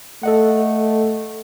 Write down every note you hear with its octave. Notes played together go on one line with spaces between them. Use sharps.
A3 A4 D#5 F#5